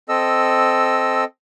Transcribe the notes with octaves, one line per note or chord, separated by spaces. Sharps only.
C4 A4 D#5 E6